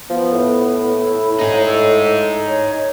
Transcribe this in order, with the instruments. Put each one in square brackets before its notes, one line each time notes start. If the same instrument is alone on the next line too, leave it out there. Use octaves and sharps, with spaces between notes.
[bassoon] F3 [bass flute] B3
[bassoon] A2
[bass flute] E4
[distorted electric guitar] D#4 G#4 [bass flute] C#5
[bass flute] A4
C#5